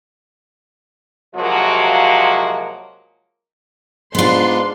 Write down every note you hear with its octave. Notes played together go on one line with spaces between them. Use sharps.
C3 F3 F#3 G#3 A#3 F#4
G#2 B3 D4 F4 C6